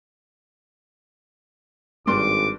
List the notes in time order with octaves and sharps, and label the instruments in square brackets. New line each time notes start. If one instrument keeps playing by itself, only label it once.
[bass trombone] G#1 [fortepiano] G2 D4 C6 [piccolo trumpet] D6